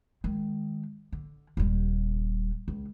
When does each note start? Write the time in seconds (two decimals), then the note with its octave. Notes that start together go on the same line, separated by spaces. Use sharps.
0.24 D#3 G#3
1.12 D3
1.57 D#1 G3
2.68 C#2